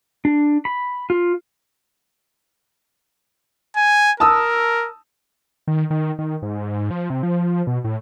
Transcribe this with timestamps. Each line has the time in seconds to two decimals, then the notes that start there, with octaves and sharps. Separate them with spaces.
0.25 D4
0.65 B5
1.10 F4
3.76 G#5
4.20 A#4 A5 D#6 E6
5.68 D#3
5.90 D#3
6.19 D#3
6.42 G#2
6.90 F3
7.10 C3
7.23 F3
7.67 B2
7.84 A2